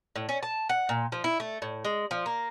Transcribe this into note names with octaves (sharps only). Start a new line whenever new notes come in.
A2
C#4
A5
F#5
A#2
F3
E4
A3
A2
G#3
F3
A#3